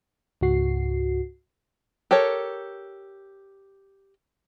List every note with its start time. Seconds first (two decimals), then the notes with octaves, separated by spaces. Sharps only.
0.41 C#2 G#2 F#4 C7
2.11 G4 A4 A#4 C#5